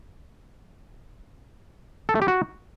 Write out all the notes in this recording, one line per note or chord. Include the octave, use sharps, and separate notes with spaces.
A4
A3
G4
F#4